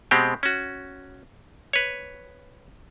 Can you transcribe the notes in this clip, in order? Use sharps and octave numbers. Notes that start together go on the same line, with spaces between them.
B2 G#3 C4 G4
C#4 F#4
B4 C#5